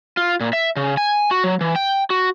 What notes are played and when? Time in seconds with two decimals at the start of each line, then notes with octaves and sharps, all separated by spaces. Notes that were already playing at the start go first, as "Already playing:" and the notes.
0.17 F4
0.40 A#2
0.53 E5
0.76 C#3
0.97 G#5
1.31 F#4
1.44 F#3
1.61 E3
1.76 G5
2.10 F#4